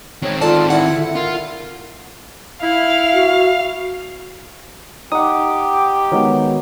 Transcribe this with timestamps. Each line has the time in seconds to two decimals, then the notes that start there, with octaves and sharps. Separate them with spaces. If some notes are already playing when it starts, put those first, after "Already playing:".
0.23 D#3 C4 C#5
0.41 F4 A4 D5 A5
0.70 E4 F#5
1.15 F4 A#4
2.63 E4 F5
3.14 F#4
5.12 D#4 G4 F#5 D6 D#6
6.12 D#3 F#3 G#3 B3